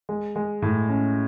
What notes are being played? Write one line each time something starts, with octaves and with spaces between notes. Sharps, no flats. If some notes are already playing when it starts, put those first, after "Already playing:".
G#3
G#3
A2
C#4